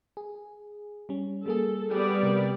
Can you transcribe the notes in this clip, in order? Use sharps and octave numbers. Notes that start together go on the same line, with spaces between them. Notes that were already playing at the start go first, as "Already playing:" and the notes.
G#4
G3 C#4
G3 A#3 G#4 A4
G3 B3 G#4 D5
C3 A#4